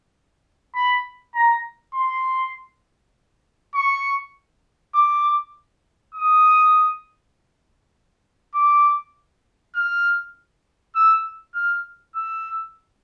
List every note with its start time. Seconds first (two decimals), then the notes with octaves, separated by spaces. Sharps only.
0.75 B5
1.35 A#5
1.94 C6
3.75 C#6
4.94 D6
6.15 D#6
8.55 D6
9.75 F6
10.96 E6
11.54 F6
12.15 E6